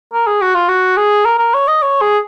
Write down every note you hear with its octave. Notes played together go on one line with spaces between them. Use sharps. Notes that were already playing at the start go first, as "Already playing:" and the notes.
A#4
G#4
F#4
F4
F#4
G#4
A#4
A#4
C#5
D#5
C#5
G#4